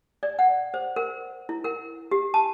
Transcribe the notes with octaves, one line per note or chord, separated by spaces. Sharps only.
D5
F#5
C5
A#4
E4
A#4
G4
A5